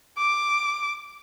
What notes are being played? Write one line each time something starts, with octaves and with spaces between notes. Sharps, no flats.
D6